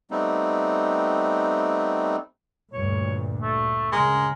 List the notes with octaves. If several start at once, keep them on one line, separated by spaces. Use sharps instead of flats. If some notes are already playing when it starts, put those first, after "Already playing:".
G3 A3 B3 C4 D#4
D2 G2 A#2 C#5
A3
C#3 G#3 A#4